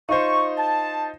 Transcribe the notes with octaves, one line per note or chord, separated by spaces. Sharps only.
D#4 F4 C5 C#6
A5